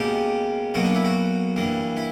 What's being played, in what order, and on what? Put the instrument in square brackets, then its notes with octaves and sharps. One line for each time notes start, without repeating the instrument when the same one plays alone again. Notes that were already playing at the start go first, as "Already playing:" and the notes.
Already playing: [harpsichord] C#2 B2 A#3 G4
B1 B2 A#3 F#4
D4
E4
F#4
G2 E3 A#3
E4